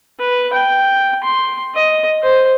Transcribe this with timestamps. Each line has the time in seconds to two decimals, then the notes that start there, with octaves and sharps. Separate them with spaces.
0.19 B4
0.53 G5
1.24 C6
1.75 D#5
2.23 C5